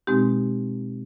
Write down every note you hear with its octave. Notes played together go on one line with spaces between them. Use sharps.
B2 G#3 C4 D#4 G4